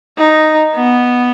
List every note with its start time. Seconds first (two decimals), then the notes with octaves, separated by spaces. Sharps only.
0.18 D#4
0.75 B3